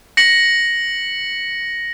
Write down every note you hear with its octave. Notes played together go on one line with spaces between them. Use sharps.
A#6 C#7 F#7